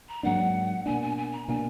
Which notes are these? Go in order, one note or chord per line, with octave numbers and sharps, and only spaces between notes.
A#5
G#2 F#3 A#3 D4 F#5
B2 A#3 D4 G#5
G#5
G#5
A#5
B2 A#3 D4 G#5